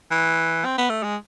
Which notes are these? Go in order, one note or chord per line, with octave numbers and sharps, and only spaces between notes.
E3
C4
B3
A3
G#3